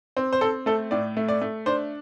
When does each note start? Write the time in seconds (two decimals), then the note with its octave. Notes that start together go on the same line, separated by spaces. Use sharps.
0.17 C4
0.33 C5
0.41 C4 A4
0.66 A3 A4
0.91 A2 D5
1.17 A3
1.28 D5
1.41 A3
1.66 D4 C5